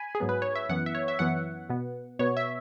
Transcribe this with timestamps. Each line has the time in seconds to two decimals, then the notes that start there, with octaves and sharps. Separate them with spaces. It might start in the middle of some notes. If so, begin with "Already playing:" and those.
Already playing: G#5 B5
0.15 G#4
0.20 G#2 F#3 B3
0.29 B4
0.42 C#5
0.55 E5
0.69 F#2 E3 B3 F#5
0.86 E5
0.95 C#5
1.08 E5
1.19 F#2 E3 B3 F#5
1.70 B2 B3
2.19 B2 B3 C#5
2.37 E5